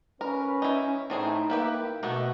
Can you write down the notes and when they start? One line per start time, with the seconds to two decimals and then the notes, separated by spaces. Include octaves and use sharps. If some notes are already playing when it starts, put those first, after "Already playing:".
0.21 C#4 A#4 B4
0.62 D#4 E4
1.10 A2 E3 C4 D#4 G#4
1.50 A#3 E4 G4 B4
2.03 B2 D#3 A3 B3 F#4